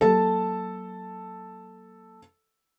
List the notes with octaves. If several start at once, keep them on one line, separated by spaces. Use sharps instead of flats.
F#3 A#3 A4 A5